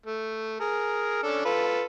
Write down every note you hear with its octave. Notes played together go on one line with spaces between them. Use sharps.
A3
G#4 A#4
C#4 D4 A4
F4 A4 B4